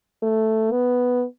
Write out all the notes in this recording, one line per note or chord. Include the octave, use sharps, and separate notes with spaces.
A3
B3